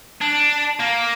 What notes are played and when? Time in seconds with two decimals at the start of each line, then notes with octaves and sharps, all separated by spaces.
0.21 D4
0.80 A#3